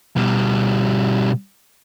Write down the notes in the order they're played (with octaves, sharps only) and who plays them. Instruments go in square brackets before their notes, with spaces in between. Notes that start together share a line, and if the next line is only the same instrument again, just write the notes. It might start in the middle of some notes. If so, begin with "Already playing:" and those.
[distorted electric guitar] B2 G3